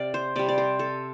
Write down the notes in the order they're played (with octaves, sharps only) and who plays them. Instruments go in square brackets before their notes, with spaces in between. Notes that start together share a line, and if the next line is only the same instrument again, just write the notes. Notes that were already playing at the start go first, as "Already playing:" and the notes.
Already playing: [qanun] C3 D5 F5
C5
C3 G3 D5
D5
C5
A4